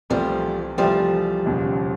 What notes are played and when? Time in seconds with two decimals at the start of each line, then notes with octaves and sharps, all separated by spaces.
0.10 C2 C3 E3 F3 G3 A3 C4
0.78 C2 C3 E3 F3 G3 A3 C4
1.46 E1 D#2 C#3